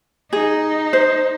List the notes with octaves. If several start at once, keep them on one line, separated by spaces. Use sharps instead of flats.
D#4 G#4
C5